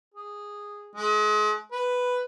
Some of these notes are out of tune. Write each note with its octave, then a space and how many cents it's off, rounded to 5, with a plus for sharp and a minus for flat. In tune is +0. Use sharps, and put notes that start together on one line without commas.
G#4 -10
G#3 +35
B4 +5